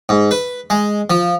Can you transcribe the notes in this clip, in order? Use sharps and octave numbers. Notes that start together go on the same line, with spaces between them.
G#2
B4
G#3
F3